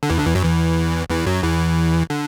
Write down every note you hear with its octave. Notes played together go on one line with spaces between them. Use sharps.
D3
E2 E3
D2 D3
E2 E3
F#2 F#3
E2 E3
E2 E3
F#2 F#3
E2 E3
D3